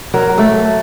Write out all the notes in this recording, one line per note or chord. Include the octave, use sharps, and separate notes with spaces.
F#3 A#4
A3 A4